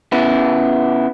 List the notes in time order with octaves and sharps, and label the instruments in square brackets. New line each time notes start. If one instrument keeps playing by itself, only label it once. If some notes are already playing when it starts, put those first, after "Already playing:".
[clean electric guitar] C#3 B3 E4